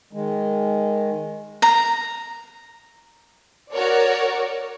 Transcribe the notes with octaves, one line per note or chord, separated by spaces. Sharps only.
D#3 G#3
A#5
F#4 A#4 C#5 D5